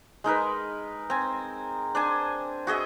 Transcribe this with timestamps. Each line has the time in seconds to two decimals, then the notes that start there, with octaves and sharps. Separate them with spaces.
0.24 G#3 D#4 A#4 B4
1.10 C4 G#5
1.95 D4 C5 G#5
2.67 F#4 G#4 D#5 E5